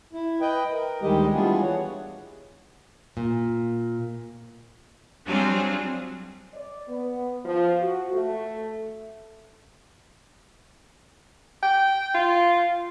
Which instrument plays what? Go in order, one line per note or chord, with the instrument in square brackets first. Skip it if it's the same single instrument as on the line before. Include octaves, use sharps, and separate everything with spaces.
[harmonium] E4
B4 D#5 G5
A#4
D2 D#3 G3 G#3 G4 D#5
E3 G3 B3 D4 F4 G#4
C#5 F#5
[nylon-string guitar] A#2
[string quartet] F#3 G3 C4 D4 F4 G#4
[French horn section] D5
B3
F3
F#4
A3
[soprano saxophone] G5
F4